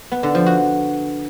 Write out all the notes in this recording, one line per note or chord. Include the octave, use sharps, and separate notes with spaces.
B3
D3
F3
F#4